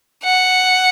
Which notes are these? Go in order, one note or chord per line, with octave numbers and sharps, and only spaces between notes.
F#5